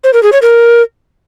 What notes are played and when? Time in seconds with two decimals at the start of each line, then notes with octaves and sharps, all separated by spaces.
0.04 C5
0.13 A#4
0.23 G#4
0.33 C#5
0.42 A#4